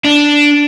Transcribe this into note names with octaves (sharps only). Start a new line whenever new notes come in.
D4